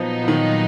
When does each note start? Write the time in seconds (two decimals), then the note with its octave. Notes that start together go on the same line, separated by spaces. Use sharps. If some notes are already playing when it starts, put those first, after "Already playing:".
Already playing: A#2 F3 F#3 B3 D#4
0.24 F3
0.28 D#3